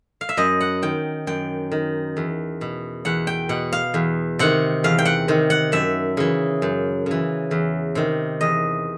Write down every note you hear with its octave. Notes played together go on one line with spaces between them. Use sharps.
F5
E5
F#2 D#5
F#5
D#3 G5
F#2 G5
D#3
E2
B2
E2 F#5
G5
B2 F#5
F5
E2
C3 D#3 F#5
E2 F5
G5
F#5
C3 D#3
F#5
F#2 E5
C#3 E3
F#2
C#3 E3
E2
C3 D#3
E2 D#5